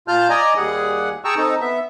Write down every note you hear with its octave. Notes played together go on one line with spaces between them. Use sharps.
A#2 F4 A5 F6 G6
D5 D#5 G#5 A#5
D#2 G3 G#4 F#5
G#4 G5 A5 A#5 C#6 E6
C4 D#4 A4
B3 E5